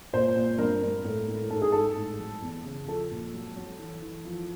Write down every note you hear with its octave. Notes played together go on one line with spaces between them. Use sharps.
A#2 C5
A#2
G2 A#4
G2
A2
A2
G#2 A4
G#4
G#2 A4
A2
F#3
E2
C#3
F3 A4
A#2
F#3
F#3
E3
E3
F3